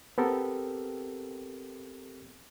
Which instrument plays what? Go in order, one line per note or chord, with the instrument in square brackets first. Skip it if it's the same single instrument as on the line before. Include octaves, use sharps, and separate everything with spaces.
[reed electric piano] B3 C4 G4 A4 A#4